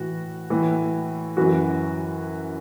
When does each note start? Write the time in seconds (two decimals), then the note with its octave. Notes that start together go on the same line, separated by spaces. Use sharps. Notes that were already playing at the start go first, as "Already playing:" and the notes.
Already playing: A2 E3 F#4
0.50 A2 E3
1.37 F#2 E3 F#4